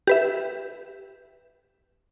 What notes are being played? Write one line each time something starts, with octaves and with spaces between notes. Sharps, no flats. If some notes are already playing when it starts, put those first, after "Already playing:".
G4 B4 E5